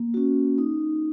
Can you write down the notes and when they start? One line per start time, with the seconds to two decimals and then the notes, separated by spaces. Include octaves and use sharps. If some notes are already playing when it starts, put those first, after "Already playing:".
Already playing: A#3
0.14 C#4 F#4
0.58 D#4